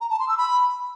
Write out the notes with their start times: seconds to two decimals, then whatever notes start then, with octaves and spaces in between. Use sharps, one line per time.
0.01 A#5
0.10 A5
0.19 C6
0.28 E6
0.38 B5